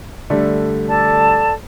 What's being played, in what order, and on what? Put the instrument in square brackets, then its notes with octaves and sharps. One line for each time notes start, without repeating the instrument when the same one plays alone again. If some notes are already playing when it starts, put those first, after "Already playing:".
[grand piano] D3 G3 A3
[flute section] A4 D5 A5